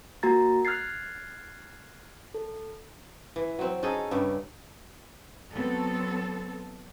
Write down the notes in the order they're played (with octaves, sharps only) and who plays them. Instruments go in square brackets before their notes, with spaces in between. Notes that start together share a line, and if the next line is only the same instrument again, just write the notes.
[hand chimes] A#3 F#4 A#5 A6
F6 F#6 G#6 A6 C7
A4
[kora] E3
F#3 C4
C#4 D#4 G#4 A4
G2 C#3 G3
[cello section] F#3 B3 C4 A4